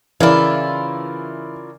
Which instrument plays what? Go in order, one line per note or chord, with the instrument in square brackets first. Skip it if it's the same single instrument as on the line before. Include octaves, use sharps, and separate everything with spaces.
[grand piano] C#3 A#4 D5 [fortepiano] E3 [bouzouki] E4 F4